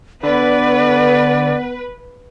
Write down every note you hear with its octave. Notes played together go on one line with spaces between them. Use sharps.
D3 B3 B4 D5